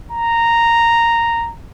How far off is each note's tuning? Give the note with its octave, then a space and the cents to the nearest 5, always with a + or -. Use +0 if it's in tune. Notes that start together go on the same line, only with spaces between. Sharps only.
A#5 -5